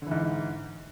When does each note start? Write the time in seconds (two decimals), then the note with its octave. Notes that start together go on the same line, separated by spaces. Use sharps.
0.02 D3
0.07 E3
0.11 G#2